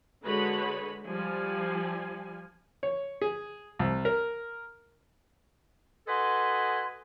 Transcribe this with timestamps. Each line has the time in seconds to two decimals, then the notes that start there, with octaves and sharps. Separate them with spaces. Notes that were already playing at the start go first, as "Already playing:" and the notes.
0.25 D3 G#3 F#4 B4 C#5 B5
1.06 F3 G3 G#5
2.83 C#5
3.21 G#4
3.79 C2
4.05 A#4
6.07 F#4 A4 B4 D#5 G#5 C6